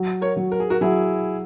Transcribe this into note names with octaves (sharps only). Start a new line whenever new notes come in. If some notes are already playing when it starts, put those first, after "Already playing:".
Already playing: F#3
A#4 C#5
F#3
A#4
G#4
F#4 A#4
F#3 E4 G#4